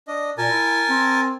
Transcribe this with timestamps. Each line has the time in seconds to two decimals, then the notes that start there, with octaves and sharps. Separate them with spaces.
0.08 D4 D#5
0.38 A#2 A#4 G#5 A5
0.49 E4
0.89 C4